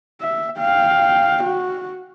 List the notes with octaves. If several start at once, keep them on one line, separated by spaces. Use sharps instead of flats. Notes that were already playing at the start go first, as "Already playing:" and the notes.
E5
F5 G5
F#4